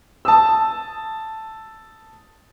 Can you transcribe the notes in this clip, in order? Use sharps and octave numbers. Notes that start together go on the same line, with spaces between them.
A5 D#6 E6